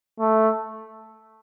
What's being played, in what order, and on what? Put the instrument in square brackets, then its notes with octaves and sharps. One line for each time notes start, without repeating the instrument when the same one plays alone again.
[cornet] A3